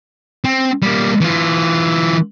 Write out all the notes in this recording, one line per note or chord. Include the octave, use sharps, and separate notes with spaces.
C4
G3 A#3
E3 F4